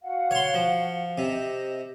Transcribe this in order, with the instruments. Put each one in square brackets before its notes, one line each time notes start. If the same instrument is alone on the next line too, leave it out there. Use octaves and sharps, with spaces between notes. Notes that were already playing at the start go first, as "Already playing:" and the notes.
[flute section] F#4 F5 F#5
[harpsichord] C#5 C6
F3
[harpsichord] C3 [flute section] G4 D#5